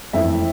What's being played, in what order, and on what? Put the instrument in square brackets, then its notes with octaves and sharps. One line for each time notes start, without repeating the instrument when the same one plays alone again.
[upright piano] F2 E3 A3 E5